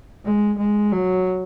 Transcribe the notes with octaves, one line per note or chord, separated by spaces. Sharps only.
G#3
G#3
F#3